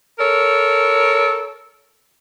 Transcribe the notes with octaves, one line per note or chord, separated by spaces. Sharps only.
A4 A#4 C#5